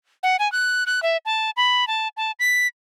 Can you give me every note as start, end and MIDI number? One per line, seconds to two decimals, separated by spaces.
0.23 0.36 78
0.39 0.50 80
0.52 0.84 90
0.87 1.02 90
1.03 1.17 76
1.26 1.50 81
1.57 1.87 83
1.87 2.08 81
2.17 2.32 81
2.40 2.67 95